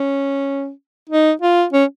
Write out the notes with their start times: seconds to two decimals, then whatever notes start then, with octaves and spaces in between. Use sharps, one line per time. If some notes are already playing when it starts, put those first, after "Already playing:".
Already playing: C#4
1.10 D#4
1.42 F4
1.73 C#4